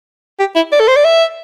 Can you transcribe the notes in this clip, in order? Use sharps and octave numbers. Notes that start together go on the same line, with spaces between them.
G4
E4
D5
A4
C5
D5
E5